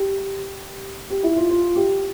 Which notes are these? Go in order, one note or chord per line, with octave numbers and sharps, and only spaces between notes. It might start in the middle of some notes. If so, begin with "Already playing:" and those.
Already playing: G4
G4
E4
F4
F4
G4